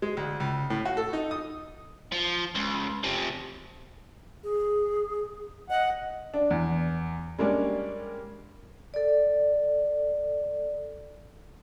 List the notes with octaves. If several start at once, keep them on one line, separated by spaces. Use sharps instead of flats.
G#3
D2
C#2
A2
F#4
A4
D#4
D#6
F3
C#2
C3 F3
G#4
D#5 F#5
D4
E2
G3 G#3 A#3 C#4 D4
A4 D5